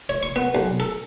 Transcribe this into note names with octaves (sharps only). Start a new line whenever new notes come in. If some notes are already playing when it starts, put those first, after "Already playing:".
C#5
C#6
B3
B1
A4